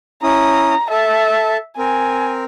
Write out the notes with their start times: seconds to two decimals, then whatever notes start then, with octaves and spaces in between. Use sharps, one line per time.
0.23 C#4 E4 A#5 D#6
0.90 A4 E5 A5
1.78 C4 A#4 G#5